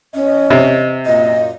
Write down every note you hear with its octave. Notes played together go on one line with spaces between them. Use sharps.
E2 C#4 D#5
C3
F#2 A#2 D#5